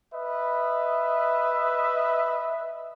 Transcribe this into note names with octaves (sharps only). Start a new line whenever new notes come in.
B4 D#5 E5